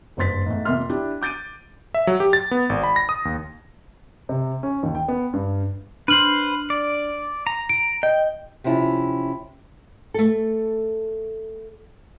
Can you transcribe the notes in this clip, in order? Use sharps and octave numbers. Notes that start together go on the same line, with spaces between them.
F#1 G2 C5 C6 A6 B6
G#2 A3
F2 C3 A#3 E5 C6 F6
D4 E4 G4
D6 G6 A6 D7 D#7
E5
F#3
G4
A6
B3
G#1
B5
A#6
D#6
D#2
C3
C#4
D#2
G5
B3
G2
D4 B4 C5 F6 F#7
D5
A#5
D7
D#5 G5
C3 F3 C#4 E4
A3 A4